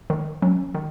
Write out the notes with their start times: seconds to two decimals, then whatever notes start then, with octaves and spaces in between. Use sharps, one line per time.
0.10 D#3
0.42 F#3 C#4
0.74 D#3